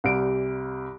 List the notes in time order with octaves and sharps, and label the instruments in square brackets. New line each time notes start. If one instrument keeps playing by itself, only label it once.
[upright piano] C2 G3 D7